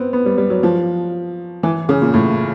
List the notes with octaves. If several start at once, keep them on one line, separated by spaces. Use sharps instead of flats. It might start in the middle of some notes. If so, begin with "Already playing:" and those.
Already playing: B3 C4
B3
G3
G3
F#3
F3
E3
C#3
A#2
A2